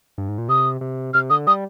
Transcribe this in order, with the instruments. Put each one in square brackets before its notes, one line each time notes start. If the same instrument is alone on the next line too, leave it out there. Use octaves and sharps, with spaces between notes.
[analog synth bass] G2
G#2
A#2
[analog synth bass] C3 [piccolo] D#6
[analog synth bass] C3
[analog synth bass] C3 [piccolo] F6
[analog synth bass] D3 [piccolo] D#6
[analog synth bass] G3 [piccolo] D#6